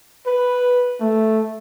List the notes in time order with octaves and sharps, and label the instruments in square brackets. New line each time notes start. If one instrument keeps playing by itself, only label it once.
[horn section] B4
A3